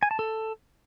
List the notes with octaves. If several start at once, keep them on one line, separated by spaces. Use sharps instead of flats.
G#5
A5
A4